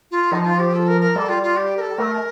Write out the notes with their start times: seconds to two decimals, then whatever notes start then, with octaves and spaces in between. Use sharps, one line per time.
0.11 F4
0.32 F3 D#4
0.46 F4
0.59 G4
0.74 A4
0.88 A#4
1.01 A#4
1.15 G3 A4
1.29 F4
1.43 F4
1.57 G4
1.77 A#4
1.81 A4
1.98 A3 A#4